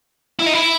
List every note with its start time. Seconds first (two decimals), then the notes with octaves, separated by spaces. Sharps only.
0.39 E4
0.47 D#4
0.54 E4